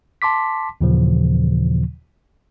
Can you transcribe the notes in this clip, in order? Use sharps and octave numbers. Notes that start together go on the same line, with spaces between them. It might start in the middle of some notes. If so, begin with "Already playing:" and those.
A5 C6 D6 B6
D#2 A#2 C#3 E3 F3